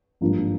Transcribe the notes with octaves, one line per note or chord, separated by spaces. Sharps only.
G#1 G2 F3 A#3 D4